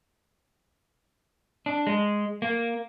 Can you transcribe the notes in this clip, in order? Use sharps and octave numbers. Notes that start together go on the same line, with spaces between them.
D4
G#3
A#3